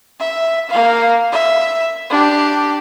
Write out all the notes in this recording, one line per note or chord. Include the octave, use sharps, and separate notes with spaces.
E5
A#3 F5
E5
D4 G4